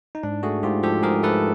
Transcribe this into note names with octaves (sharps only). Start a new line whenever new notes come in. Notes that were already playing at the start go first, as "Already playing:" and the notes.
D#4
G#2 D4
A3 F#4 G#4
G#2 F4 G4
F3 G4 A4
G#2 G#4 A#4
A3 A4 B4